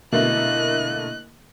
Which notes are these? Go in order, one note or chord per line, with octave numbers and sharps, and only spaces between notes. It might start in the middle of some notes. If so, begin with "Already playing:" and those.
B2 D3 A3 A#3 E4 D#5 F#6